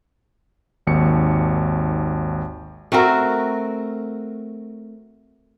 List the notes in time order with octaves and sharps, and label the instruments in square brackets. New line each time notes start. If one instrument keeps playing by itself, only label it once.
[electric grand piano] G#1 D#2 C#7
[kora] A3 C4 F#4 A#4